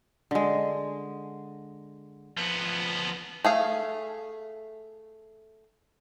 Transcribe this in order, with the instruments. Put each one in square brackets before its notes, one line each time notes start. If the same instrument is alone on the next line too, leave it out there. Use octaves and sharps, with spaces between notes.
[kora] D3 G#3
[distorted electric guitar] F3 B3
[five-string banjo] A3 G#4 F5